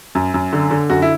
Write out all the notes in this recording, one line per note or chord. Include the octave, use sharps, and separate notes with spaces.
F#2
F#2
D3
D3
F#2 F#4
E4